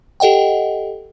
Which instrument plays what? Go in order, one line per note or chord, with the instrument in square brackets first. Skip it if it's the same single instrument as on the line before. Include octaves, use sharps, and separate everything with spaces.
[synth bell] G4 A4 D#5 F#5 G5